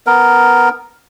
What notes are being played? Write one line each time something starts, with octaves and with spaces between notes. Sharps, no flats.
B3 A#4